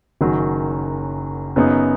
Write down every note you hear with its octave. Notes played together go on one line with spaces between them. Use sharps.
F#1 F#2 D#3 F#3
F#2 C#3 B3 D#4